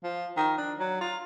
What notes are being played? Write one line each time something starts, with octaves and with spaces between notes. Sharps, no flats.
F3
D#3
D4
F#3
F4